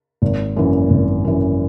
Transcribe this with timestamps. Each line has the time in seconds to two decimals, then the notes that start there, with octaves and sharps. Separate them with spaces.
0.22 G#1
0.57 F#2 E3
0.90 G#1
1.25 F#2 E3